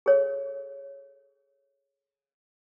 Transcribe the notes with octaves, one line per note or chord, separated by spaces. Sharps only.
G#4 A4 C#5